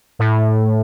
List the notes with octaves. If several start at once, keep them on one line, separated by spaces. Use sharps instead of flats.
A2